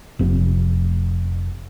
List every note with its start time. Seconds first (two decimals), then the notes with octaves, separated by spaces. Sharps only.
0.19 F1 C4